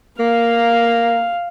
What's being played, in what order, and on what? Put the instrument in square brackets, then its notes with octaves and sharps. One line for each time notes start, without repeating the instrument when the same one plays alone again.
[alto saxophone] A#3 [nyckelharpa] F5